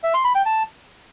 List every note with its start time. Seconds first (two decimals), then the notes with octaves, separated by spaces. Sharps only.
0.03 E5
0.14 C6
0.25 B5
0.35 G5
0.46 A5